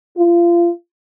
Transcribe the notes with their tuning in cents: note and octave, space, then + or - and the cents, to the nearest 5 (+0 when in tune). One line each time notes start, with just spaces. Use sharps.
F4 -30